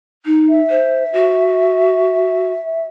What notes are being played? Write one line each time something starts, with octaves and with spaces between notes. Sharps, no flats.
D#4
E5
C5
F#4